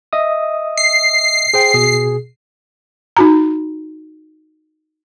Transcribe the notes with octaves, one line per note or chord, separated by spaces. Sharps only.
D#5 E5 D#6
C7
G#4 C5 G5
B2 G#4
D#4 F#4 A#5